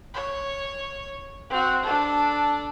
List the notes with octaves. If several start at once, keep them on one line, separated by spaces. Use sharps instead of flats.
C#5
C4 F#4
D4 A4